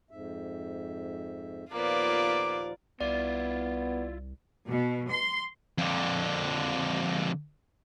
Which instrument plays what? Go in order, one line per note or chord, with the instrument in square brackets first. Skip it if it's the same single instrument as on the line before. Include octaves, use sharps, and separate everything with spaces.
[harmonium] F2 G#2 E5
[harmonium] D#2 A#2 F3 [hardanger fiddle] A#3 B3 [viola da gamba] F4 D5 [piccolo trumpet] D6
[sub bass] C2 [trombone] B3 [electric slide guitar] E4 F4 [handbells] D5
[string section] B2
C6
[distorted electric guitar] F2 D3